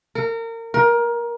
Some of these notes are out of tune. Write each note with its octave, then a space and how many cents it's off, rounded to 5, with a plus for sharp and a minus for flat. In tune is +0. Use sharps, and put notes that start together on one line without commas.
A#4 -30
A#4 +20